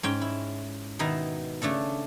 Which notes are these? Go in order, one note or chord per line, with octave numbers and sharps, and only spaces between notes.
G#2 C#4 G5
E4
B2 D#3 D#4 E4
C#3 A3 D4 A4